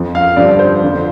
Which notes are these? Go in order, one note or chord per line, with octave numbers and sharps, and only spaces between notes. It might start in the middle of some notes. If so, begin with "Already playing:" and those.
Already playing: F2 F3
F5
G2 D3 F3 D5
C5
F2 D3 F3